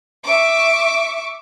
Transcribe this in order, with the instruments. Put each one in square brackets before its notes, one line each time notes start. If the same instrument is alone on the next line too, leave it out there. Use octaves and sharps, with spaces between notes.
[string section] E5 C#6 D6